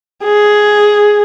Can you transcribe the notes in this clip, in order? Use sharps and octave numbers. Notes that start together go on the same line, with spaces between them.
G#4